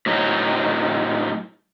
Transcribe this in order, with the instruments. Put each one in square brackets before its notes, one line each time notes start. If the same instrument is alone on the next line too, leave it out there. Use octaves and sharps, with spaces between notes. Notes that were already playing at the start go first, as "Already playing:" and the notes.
[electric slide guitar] A2 F#3 D#4